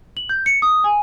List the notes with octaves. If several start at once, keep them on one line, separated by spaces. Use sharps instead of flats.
F#7
G6
C#7
D#6
G#5